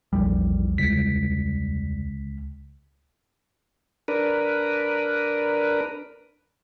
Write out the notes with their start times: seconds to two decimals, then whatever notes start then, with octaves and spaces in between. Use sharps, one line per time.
0.13 A#1 E2 G3
0.78 C#2 B6
4.08 D4 A#4 B4